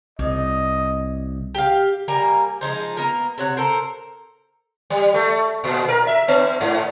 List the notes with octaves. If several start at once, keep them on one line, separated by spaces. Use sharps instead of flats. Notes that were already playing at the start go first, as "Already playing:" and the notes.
C2 D#5
G4 F5
G3 A#3 G#5 A#5
F3 G#3 D#4 C5
A#3 B3 A#4
C3 C#5 F#5
A4 A#4 C5
G3
A3
A#2
A#4
E5
B3
G#2